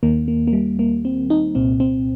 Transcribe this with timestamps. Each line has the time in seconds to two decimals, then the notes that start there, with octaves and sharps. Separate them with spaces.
0.03 D#2 D#3 A#3
0.28 A#3
0.47 A#3
0.53 G3
0.79 A#3
1.05 C4
1.30 D#4
1.55 C2 A#2 C4
1.80 C4